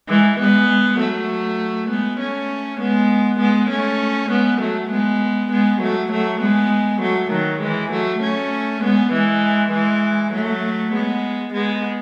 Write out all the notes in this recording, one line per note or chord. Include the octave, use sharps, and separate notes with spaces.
E3 G#3
G#3 B3
F#3 A3
G#3 B3
A3 C#4
G#3 B3
G#3 B3
A3 C#4
G#3 B3
F#3 A3
G#3 B3
G#3 B3
F#3 A3
F#3 A3
G#3 B3
F#3 A3
D#3 F#3
E3 G#3
F#3 A3
A3 C#4
G#3 B3
E3 G#3
E3 G#3
F#3 A3
G#3 B3
G#3 B3